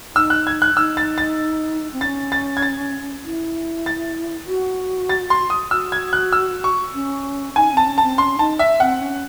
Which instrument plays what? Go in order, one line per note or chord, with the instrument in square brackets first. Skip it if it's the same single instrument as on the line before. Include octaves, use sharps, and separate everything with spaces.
[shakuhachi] D#4 [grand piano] E6
[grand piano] F#6
G#6
F#6
[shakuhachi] D#4 [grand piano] E6
[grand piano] A6
A6
[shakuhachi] C4
[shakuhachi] C#4 [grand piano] A6
[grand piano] A6
G#6
A6
[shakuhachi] E4
[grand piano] A6
[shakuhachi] F#4
[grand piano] A6
C6
D#6
[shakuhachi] F#4 [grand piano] E6
[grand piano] G#6
F#6
E6
C#6
[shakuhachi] C#4
[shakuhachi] D#4 [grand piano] G#5
[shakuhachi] C4 [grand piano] A5
[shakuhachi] C#4
[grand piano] A5
[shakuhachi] C4
[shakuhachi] C#4 [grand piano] C6
[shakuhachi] D#4 [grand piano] A5
[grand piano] E5
[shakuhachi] C4 [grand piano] F#5
[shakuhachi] C#4